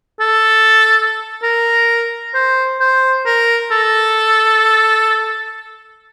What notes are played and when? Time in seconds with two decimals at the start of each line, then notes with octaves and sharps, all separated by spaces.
0.20 A4
1.43 A#4
2.34 C5
2.80 C5
3.26 A#4
3.72 A4